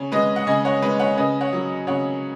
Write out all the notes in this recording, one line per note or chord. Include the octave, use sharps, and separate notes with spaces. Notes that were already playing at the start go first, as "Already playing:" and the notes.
Already playing: C#3 C#5
G#3 B4 D#5
F#5
C#3 D#5 G#5
C#5 F#5
G#3 B4 D#5
C#5 F#5
C#3 B4 D#5
C#5 F#5
F#3
C#3 C#5 F#5